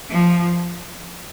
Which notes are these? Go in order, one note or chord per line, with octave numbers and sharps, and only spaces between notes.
F3